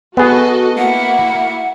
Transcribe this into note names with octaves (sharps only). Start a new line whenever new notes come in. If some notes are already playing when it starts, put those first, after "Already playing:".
B3 F#4 G#4 A4 D#5
A#3 E4 F#4 F#5